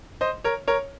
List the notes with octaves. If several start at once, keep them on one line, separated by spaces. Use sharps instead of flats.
C5 D#5
A#4 C#5
A#4 C#5